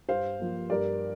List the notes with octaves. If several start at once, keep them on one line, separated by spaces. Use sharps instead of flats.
G2 C5 F5
F3 A#3
G2 A#4 D5